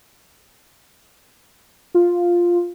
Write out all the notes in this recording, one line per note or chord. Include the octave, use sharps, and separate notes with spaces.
F4